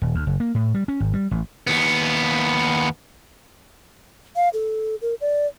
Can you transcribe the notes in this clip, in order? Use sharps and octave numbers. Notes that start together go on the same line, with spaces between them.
D#1
D2
F#1
A#3
A2
G3
C#4
G#1
G3
A1
D#2 B3
F5
A4
A#4
D5